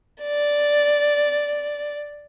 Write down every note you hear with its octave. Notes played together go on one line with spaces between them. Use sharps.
D5